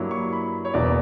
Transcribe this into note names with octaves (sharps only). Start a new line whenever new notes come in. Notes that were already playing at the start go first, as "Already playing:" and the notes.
Already playing: G2 F#3 A#3 E4
C#6
B5
C#5
E1 E2 B2 A#3 D5